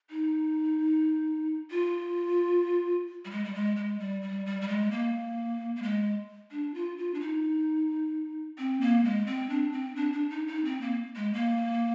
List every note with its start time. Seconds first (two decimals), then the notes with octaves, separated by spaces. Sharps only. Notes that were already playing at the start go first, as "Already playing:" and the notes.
0.10 D#4
1.71 F4
3.25 G3
3.31 G#3
3.45 G3
3.54 G#3
3.76 G#3
3.99 G3
4.22 G3
4.46 G3
4.61 G3
4.68 G#3
4.91 A#3
5.76 A#3
5.83 G#3
6.51 D4
6.74 F4
6.98 F4
7.14 D4
7.21 D#4
8.58 C4
8.81 A#3
9.05 G#3
9.26 C4
9.50 D4
9.72 C4
9.96 D4
10.13 D4
10.30 D#4
10.47 D#4
10.65 C4
10.81 A#3
11.16 G#3
11.34 A#3